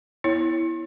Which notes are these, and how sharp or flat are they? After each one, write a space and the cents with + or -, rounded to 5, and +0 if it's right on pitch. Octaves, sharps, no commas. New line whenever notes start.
B3 +0 E4 +0 C#5 +0